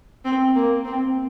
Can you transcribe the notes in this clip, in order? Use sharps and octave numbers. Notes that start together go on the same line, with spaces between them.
C4
A#3
C4